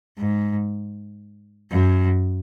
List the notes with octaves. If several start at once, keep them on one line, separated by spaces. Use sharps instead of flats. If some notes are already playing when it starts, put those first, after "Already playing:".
G#2
F#2